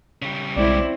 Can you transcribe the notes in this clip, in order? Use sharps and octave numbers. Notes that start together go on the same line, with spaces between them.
C#3 G3
B1 G#3 C4 E4 D5